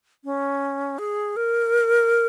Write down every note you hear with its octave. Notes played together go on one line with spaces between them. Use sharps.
C#4
G#4
A#4